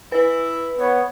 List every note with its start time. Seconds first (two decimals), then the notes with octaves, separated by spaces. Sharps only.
0.12 E4 B4
0.79 B3 C#5